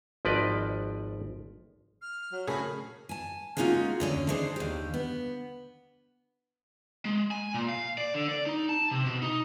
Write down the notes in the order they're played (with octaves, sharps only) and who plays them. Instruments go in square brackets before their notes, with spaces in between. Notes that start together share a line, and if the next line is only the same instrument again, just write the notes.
[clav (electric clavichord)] G#1 F3 B4 D5 D#5
[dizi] F6
[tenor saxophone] F#3
[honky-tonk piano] C#3 A3 G#4 [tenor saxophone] A#4 [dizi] B5
[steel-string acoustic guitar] G#5 A5
G#3 A#3 C#4 D#4 F4 F#4
D#2 D3 C#4
D4 D#4 G#4 C5
D#2 G4
B3
[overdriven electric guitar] G#3
G#5
A#2
F5
D5
D3
D5
D#4
A5
C3
B2
D#4